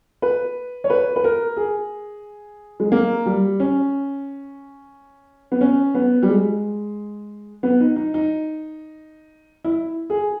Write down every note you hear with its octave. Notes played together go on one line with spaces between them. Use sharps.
B4
C#5
B4
B4
A#4
G#4
G#3
A#3
G3
C#4
B3
C#4
B3
G3
G#3
B3
D#4
D#4
D#4
E4
G#4